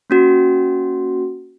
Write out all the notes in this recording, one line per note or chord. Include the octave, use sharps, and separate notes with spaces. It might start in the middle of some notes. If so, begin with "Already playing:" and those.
A#3 C#4 F#4